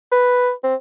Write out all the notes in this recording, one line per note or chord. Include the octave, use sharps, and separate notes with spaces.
B4
C4